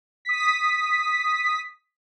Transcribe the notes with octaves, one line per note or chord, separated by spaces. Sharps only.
D#6 B6